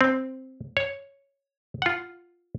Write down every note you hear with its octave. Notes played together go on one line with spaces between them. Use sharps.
C4
C#5
F4 F#5